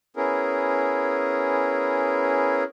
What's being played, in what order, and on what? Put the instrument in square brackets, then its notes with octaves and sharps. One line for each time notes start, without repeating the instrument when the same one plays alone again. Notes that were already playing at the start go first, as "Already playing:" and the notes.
[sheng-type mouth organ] B3 C#4 E4 G#4 A#4